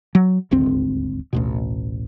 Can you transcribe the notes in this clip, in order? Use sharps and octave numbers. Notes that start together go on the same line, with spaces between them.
F#3
D#1 G#1 D2 C4
A1 D2 B2